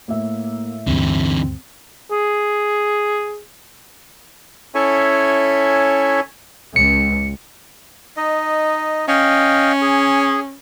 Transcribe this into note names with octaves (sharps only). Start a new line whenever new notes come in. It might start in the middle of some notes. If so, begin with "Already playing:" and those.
A2 A#3 E5
D2 G2 D3 E3 C4
G#4
C#4 E4 A4 C#5 E5 G#5
C#2 C#7
D#4 D#5
C#4 D#5 F5 G5
G#4